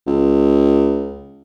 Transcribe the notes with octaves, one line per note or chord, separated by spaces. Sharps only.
C#2